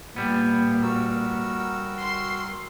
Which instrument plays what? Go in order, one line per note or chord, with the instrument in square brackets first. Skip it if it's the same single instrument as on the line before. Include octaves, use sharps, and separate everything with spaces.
[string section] A#2 [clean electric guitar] G3 B3
[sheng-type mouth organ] F#4 A#4 E6
[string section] C6